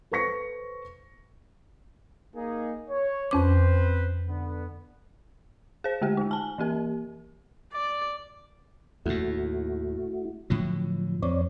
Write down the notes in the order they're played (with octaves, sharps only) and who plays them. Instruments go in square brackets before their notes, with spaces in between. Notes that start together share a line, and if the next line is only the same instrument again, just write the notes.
[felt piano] A4 B4 C5 C#6 A#6 C#7
[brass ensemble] A#3 D#4 G#4
C#5
[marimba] F2 C#4 D6 [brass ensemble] C4 B4 C5
[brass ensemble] D3 B3
[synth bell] G#4 C5
D3 G#3 A3 G4
G#3 D#4
G#5 A5
E3 A#3 G4 A#4
[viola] D5
[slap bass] D#2 A2 [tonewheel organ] A3 E4 F#4
[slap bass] A2 D3 F#3 [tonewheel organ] F3
[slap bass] F2 [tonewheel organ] C4 C#5 D5